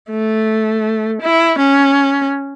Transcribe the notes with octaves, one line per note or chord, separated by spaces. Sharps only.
A3
E4
C#4